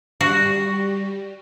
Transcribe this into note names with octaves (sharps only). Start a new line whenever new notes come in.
G3 F#4